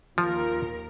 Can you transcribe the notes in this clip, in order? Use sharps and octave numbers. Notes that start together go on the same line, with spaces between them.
D#2 F3 F4 A#4